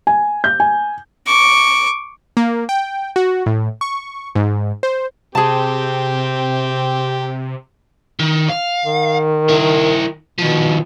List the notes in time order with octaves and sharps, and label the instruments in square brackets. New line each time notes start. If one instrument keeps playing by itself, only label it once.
[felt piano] G#5
G6
G#5
[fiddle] C#6 D6
[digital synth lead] A#3
G5
F#4
A2
C#6
G#2
C5
[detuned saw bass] C3 [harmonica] C4 G4 [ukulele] G#4 A5
[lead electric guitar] D#3
F5
[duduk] D#3
[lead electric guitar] E4 A#4
[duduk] B2 [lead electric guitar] D#3 F3